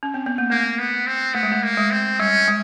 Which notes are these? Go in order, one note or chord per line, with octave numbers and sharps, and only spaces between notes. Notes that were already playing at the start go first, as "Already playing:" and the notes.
C#4
C4
B3
A#3
A3 A#3
B3
C4
A3 B3
G#3
A3
A#3
G#3
C4
G3 C#4
G#3